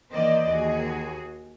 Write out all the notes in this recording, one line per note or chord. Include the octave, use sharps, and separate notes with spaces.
D#3 E3 A#3 C5 D5 D#5
D#2 F#4 G#4